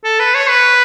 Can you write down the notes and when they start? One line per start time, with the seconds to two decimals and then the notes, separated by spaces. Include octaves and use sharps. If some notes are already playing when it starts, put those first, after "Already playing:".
0.04 A4
0.20 B4
0.35 C#5
0.49 B4